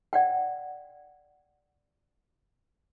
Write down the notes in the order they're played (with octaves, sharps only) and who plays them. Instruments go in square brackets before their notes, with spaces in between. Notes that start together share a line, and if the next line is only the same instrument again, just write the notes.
[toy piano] D5 F#5 G5